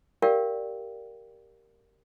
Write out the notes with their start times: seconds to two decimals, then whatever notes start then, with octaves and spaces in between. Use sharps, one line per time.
0.22 G4 A#4 D5 F5 G5